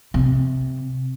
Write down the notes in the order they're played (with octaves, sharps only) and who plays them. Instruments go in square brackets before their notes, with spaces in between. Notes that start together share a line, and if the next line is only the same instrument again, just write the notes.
[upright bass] C3